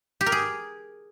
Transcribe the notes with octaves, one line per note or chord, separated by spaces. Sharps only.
G4
A#4
G#4